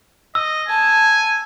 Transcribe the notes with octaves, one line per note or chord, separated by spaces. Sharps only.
D#5 E6
G#5 A5